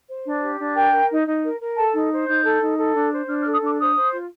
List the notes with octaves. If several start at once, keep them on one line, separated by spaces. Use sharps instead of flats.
C5
D4
G4
D4
A#4 G5
A#4
D#4
D#4
A#4
A#4
A4 A5
D#4
C5
D#4 G6
A4
D#4
A4
D4
C5
D4 F6
F6
A4
D#6
D4 D6
C5 D#6
C5
F4